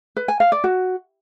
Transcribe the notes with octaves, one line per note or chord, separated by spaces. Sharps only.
B4
G#5
F5
D5
F#4